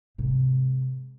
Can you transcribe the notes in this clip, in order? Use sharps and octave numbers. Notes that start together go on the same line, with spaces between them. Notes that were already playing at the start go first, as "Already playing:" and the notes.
G#2 C3